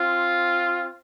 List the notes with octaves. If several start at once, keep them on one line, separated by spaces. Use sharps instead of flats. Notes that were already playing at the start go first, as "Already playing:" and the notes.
Already playing: C4 F4